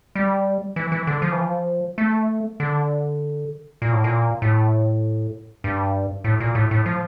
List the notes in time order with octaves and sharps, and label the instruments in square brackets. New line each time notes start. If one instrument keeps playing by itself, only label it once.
[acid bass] G3
E3
E3
D3
F3
E3
F3
A3
D3
A#2
A2
A#2
A2
G2
A2
A#2
A2
A2
F3